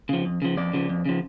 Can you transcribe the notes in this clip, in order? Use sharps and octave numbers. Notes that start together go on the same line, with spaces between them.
C#3 F3
F2
C#3 F3
F2 D5
C#3 F3
F2
C#3 F3